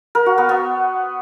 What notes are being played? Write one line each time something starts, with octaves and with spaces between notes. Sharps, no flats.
A#4
F#4
B3
B3